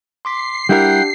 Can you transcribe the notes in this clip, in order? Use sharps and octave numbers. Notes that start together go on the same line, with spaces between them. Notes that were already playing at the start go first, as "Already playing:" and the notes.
C6 D6 B6 C7
G3 D4 E4 G4 A#4 F#5 G5